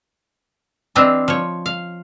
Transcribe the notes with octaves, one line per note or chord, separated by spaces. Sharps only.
E3 C4 D4 F4 D#5 E5
F3 C#5
F5